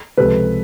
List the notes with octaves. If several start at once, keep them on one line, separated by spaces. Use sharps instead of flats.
C#2 C3 F3 A4 B4